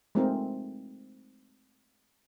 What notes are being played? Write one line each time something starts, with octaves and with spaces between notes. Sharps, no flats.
G#3 A3 C4 D#4 F4 A#4